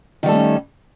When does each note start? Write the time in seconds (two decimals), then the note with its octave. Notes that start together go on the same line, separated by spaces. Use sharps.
0.23 D#3
0.26 G3
0.29 A4
0.31 A3
0.34 C#4